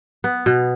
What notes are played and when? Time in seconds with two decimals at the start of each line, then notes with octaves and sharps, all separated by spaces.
0.24 B3
0.46 B2